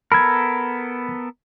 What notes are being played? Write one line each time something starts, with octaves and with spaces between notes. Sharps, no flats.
B3 A4 A#4 B5 G#6